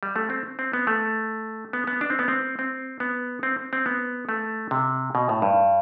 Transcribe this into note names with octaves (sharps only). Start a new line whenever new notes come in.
G3
A3
C4
C4
B3
A3
B3
B3
D4
C4
B3
C4
C4
B3
C4
C4
B3
A3
C3
B2
A2
G2